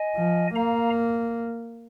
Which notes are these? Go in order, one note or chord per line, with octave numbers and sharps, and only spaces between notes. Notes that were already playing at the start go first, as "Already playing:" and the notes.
Already playing: D#5 G#5
F3
A#3 F5 A#5